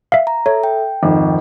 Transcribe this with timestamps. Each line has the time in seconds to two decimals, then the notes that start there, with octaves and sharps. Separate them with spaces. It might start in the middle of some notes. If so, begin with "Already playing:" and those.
0.12 E5 F5
0.27 A#5
0.46 A4 C#5 E5
0.64 G5
1.03 G#1 F2